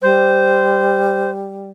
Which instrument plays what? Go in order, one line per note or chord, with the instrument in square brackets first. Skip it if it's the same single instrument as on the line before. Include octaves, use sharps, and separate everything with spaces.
[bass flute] G3 [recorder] C5